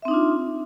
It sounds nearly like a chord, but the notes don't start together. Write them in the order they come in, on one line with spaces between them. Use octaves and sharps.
E5 C4 D#4 D4 F4